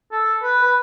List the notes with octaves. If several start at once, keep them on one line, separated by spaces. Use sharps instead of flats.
A4
B4
B4